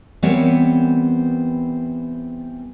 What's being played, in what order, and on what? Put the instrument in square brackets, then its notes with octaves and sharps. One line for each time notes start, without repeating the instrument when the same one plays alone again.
[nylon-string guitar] E3 G3 B3 C4 A#4 C#5